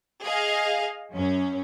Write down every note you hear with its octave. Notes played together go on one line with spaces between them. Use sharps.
G#4 D#5 F5
F#2 C#4